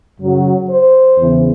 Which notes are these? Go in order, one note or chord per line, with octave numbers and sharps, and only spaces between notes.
F#2 C#3 F#3
C5
E2 C#3 E3